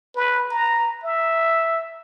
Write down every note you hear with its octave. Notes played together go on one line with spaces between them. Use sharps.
B4
A#5
E5